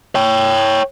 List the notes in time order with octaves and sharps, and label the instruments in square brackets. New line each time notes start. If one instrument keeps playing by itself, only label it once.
[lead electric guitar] C#5 G5